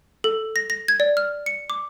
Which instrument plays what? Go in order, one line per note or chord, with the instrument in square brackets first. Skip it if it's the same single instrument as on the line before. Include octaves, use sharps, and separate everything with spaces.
[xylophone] A4
A#6
A#6
G#6
D5
F6
C#7
D6